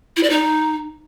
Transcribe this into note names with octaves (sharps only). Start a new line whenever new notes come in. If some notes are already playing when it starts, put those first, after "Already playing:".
E4
D5
D#4